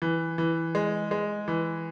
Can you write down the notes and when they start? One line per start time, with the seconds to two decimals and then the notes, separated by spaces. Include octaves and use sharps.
0.02 E3
0.38 E3
0.75 G#3
1.11 G#3
1.48 E3